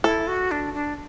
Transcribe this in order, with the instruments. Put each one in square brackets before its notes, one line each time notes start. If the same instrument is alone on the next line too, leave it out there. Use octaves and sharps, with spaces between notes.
[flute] E4 [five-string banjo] A4
[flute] F#4
D4
D4